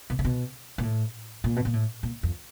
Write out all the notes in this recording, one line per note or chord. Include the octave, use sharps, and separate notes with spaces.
B2
C3
B2
A#2
A2
A#2
B2
A#2
A2
A#2
F2